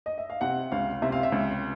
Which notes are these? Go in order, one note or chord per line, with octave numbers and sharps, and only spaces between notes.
D#5
E5
F5
C3 F#5
C#2 F5
C3 E5
F5
E5
C#2